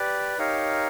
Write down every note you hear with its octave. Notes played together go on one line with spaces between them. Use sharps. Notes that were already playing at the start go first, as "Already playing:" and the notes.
Already playing: G4 B4 D5
D#4 G4 A#4 C#5 F5